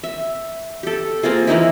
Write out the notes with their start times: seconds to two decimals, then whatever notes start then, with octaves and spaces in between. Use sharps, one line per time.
0.04 E5
0.83 G4 A4
1.23 A#3 C4 F4 G#4
1.47 E3 A#3 D#4 E4